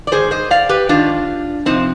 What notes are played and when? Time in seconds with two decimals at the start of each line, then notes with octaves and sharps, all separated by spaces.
0.07 D5
0.12 G#2 D#3 G#4 C5
0.31 C5 D#5
0.50 D5 F5
0.69 G4 B4
0.89 G#2 D#3 D4 F4
1.65 F2 C3 F3 C4 D#4